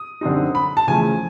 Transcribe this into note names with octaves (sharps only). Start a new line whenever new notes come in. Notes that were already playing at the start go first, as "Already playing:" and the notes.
Already playing: D#6
F#2 D3 G3 C4 D#4
B5
A5
E2 C#3 F3 A3 G#5